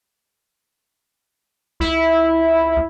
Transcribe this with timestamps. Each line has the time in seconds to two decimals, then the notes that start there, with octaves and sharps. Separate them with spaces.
1.80 C#2 E4